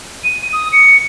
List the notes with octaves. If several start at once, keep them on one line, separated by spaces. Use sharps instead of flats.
D#7
D#6
C#7